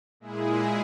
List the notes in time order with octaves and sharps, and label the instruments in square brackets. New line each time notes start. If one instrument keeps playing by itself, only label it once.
[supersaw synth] A#2 G#3 E4 G#4